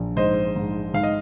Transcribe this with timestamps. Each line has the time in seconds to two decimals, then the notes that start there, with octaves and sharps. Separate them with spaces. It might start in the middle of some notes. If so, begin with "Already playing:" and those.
Already playing: A#1
0.16 G#2 C5 D#5
0.56 G#2
0.93 G#2 F5
1.03 D#5